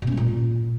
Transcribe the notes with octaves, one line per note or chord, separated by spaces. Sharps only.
B2
C#4
G#3
A#2